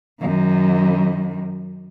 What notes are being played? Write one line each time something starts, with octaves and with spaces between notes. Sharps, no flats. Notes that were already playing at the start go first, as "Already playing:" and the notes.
F#2 D#3